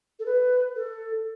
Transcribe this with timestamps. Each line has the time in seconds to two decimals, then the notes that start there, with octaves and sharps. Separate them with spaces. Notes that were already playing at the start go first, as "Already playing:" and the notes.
0.19 A4
0.26 B4
0.76 A4